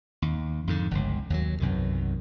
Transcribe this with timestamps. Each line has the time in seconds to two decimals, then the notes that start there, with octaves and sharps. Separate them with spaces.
0.22 D#2
0.67 F2 G#2 D3
0.91 G1 C#2
1.30 D#2 F3 F#3
1.60 B1 F#2 C3 D#3